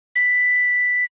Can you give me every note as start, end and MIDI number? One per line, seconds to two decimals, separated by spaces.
0.16 1.04 95